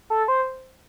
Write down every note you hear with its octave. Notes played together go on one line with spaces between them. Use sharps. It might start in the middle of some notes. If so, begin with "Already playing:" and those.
A4
C5